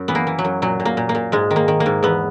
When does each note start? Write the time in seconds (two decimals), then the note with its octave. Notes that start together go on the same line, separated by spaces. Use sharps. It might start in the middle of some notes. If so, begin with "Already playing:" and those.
Already playing: F#2
0.08 E3 B3
0.15 A#3
0.27 E3
0.39 F#3
0.44 F#2
0.62 A#2 F#3
0.80 A#2
0.85 A#3
0.97 A#2
1.09 A#3
1.15 A#2
1.32 G#2 G#3
1.51 D#3
1.56 A#3
1.68 D#3
1.80 A#3
1.86 G#2
2.03 E2 B3